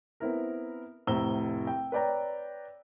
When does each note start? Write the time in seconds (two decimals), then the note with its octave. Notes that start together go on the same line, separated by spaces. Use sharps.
0.20 B3 C4 E4 A#4
1.07 F1 A2 C5 A#5 E6 G7
1.67 G5
1.92 B4 C#5 D5 G5 A#5